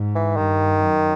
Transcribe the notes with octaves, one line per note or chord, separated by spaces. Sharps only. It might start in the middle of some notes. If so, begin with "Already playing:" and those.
Already playing: G#2
E3
G2 D#3
F#2